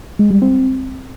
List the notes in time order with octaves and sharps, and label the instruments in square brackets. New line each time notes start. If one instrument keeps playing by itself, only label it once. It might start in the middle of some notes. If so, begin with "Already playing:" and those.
[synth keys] G#3
G3
C4